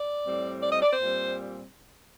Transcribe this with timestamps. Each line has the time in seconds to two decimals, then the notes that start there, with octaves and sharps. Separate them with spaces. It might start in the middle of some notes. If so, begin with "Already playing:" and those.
Already playing: D5
0.24 A2 G3 C4
0.63 D5
0.72 D#5
0.82 D5
0.92 C5
1.02 A#2 G3 C4